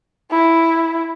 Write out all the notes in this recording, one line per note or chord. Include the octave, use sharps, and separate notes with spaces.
E4